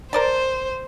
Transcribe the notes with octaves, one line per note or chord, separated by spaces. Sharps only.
A#4 C5 D5 A5